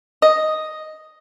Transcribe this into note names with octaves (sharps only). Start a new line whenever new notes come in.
D#5